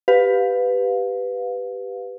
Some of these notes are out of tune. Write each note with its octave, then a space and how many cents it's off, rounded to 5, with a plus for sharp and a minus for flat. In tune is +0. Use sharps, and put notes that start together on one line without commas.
G4 +0 B4 +10 F5 +20